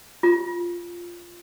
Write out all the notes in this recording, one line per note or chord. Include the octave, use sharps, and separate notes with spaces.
F4